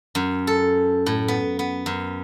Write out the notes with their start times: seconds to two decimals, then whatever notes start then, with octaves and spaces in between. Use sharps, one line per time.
0.15 F#2
0.47 A4
1.06 A2
1.28 B3
1.59 B3
1.86 F#2